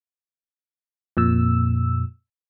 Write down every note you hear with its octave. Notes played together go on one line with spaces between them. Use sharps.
F2 A#2 E6